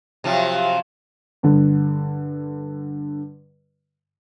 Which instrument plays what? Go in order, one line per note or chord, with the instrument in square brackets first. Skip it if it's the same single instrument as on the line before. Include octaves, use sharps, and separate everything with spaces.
[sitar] C3 F3 F#3
[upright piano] G2 D3